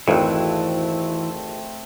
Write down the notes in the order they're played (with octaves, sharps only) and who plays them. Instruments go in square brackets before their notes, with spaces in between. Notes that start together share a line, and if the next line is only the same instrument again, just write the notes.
[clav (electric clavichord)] G#1 F2 [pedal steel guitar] E3 E4 [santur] A3 C4